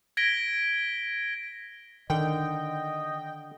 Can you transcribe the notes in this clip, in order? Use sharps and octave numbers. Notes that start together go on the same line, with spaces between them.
G#6 A#6 B6 D7 G7
D3 D#3 D#5 G5